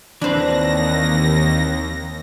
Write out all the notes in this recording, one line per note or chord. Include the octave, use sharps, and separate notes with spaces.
D#2 E3 C4 D4 B4 C5 A#6